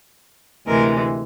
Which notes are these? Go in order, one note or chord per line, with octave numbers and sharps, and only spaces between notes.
D2 C3 E3 G#3 A#4